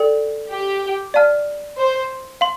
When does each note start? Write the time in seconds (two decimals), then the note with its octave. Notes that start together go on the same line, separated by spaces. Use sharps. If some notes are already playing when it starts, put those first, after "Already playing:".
Already playing: A4 D5 G5
0.51 G4
1.14 D5 F5 A5 F6
1.78 C5
2.41 F5 C6